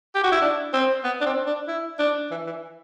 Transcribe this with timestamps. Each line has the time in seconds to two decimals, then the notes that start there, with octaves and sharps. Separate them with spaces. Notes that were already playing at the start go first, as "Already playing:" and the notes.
0.15 G4
0.24 F#4
0.32 E4
0.42 D4
0.73 C4
1.04 B3
1.21 D4
1.26 C4
1.46 D4
1.68 E4
1.99 D4
2.31 E3
2.47 E3